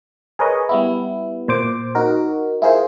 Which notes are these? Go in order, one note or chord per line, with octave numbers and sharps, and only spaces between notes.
G#4 A#4 B4 C#5 D#5
G3 B3 E4
A#2 C5 D6
D#4 F#4 A#4
E4 F4 G#4 A#4 C5